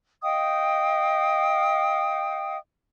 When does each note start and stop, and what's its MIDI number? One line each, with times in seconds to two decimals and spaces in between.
0.22 2.57 75
0.22 2.57 77
0.22 2.57 79
0.22 2.57 87